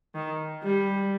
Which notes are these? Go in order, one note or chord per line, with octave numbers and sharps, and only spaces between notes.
D#3
G3